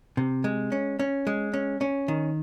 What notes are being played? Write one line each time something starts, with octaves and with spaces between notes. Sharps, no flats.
C3
G#3
C#4
C#4
G#3
C#4
C#4
D#3